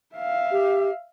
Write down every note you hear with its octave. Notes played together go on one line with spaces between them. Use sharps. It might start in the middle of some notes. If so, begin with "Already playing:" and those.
E5 F5
G4